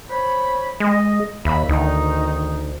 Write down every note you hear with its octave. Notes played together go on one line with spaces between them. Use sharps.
C5 C#5 B5
G#3 D#5
D#2 E5 B5
D2 D#3 D#4